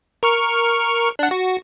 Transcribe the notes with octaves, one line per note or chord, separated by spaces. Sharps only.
A#4 C#6 F6
D4 F#5
F#4